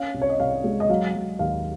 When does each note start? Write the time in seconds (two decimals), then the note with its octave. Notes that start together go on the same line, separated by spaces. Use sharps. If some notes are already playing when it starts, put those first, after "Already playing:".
Already playing: C#4 F5
0.14 C2
0.22 C#5
0.30 D#5
0.40 C2 F5
0.64 G#3
0.80 D#5
0.89 F#3 F5
1.15 F#3
1.39 D#2 F5